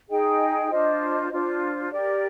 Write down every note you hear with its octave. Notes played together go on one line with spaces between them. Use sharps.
D#4 G#4 D#5 G5
D4 F4 C5 D#5
D4 F4 C5
G4 A#4 D5